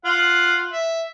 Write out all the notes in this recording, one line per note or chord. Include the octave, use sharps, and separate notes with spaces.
F4 F#5
E5